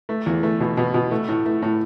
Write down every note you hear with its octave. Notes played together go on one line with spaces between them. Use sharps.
A3
E2
A3
B2
B2
B2
A3
A2
A3
A2